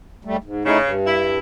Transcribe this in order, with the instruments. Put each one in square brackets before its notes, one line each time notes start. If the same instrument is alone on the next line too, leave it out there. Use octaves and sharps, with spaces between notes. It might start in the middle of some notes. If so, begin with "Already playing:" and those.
[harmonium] D#2 G3 A3
G#2
[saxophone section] C#3 [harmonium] A3 D#4 E4
[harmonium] G2
[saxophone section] E4